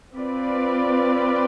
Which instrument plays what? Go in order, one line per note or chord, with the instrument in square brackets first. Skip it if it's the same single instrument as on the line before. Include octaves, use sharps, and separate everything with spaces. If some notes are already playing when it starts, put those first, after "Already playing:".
[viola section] C4 F4 B4 D5